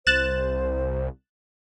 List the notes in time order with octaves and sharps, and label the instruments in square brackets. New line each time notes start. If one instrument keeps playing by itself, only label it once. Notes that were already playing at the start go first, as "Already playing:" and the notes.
[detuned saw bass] C2 [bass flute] C5 [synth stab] F#6 A6 E7